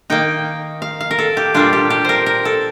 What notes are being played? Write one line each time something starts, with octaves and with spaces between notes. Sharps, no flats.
D#3 A#3 D#4 G5
F5
F5
A#4
A4
G4
A#2 G3 D4 F4
G4
G4
A#4 C5
A#4
A4